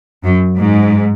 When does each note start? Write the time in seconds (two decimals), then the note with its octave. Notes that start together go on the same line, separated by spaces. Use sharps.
0.24 F#2
0.60 G#2